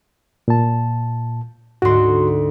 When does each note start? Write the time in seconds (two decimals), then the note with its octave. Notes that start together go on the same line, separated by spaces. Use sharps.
0.48 A#2 A5
1.82 D2 G#2 F#4 C6